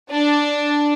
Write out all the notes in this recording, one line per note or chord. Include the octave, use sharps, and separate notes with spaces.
D4